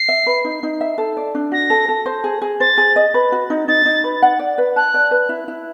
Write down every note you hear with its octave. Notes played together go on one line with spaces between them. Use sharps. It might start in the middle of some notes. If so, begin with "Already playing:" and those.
Already playing: C7
E5
B4
D#4
D#4
E5
A4
D5
D4
F#4 A#6
A4
A4
C5
G#4
G#4
C5 A6
G#4
D#5
B4
F#4
D#4
D#4 A6
D#4
B4
F#5
D5
B4
A5 F#6
D5
B4
E4
E4